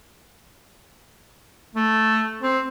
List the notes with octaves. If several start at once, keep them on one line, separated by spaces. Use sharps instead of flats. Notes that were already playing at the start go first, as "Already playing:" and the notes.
A3
C4